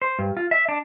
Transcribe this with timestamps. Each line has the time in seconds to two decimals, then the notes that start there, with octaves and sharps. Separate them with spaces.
0.02 C5
0.19 G2
0.37 F4
0.51 E5
0.69 D4